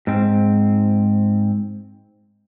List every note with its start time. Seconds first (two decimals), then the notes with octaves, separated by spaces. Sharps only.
0.07 G#2 C4